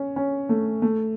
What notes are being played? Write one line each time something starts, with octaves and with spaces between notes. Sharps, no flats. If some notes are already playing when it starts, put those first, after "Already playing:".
Already playing: C#4
C#4
A3
A3